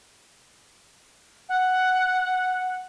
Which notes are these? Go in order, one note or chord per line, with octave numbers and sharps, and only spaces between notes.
F#5